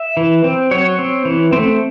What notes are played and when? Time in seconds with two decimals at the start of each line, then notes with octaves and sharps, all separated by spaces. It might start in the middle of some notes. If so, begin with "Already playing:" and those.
Already playing: E5
0.17 E3
0.44 C4
0.71 F#3 C#5
0.99 C4
1.25 E3
1.53 A3 C4